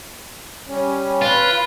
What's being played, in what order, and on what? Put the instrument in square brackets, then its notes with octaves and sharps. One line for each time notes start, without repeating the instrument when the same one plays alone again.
[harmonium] G3 C#4
[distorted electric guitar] F4 [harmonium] B4